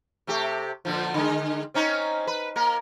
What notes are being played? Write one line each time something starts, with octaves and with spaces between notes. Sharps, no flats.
C3 A3 G4
A#2 D3 F3
D3 G#3
C4 C#4 D#4
B4
A#3 A#4